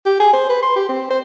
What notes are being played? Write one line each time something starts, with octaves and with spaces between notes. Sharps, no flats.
G4
G#4
C5
B4
C6
G4
C4
C5